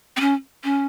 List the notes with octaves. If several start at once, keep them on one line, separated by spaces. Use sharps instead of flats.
C4
C#4
C#4